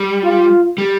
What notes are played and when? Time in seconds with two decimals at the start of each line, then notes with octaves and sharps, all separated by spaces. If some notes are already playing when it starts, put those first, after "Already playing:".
Already playing: G3
0.24 F4
0.78 G3